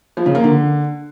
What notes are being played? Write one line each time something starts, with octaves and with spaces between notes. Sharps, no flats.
F3
C#3
A#3
D3